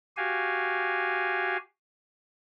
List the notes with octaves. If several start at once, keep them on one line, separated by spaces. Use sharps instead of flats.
F#4 G4 F5 G#5